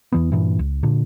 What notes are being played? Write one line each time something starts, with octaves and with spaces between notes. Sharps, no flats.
E2 E3 B3
G2 A#2 E3
C#2
A#2 D3